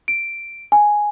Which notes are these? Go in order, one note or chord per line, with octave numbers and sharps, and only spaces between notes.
D7
G#5